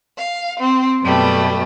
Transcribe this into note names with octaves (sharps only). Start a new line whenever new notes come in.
F5
C4
F#2 B2 G3 A3